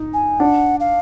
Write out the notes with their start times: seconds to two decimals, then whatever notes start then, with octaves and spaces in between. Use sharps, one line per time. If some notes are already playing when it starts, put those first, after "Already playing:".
Already playing: D#4
0.14 G#5
0.40 D4 F#5
0.80 F5